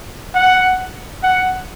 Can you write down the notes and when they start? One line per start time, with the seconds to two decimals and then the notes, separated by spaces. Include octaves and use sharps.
0.35 F#5
1.23 F#5